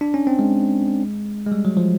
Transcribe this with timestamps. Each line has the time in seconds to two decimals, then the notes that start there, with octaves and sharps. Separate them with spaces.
0.01 D4
0.14 C#4
0.27 C4
0.39 G#3
1.47 G#3
1.52 G3
1.65 F#3
1.77 F3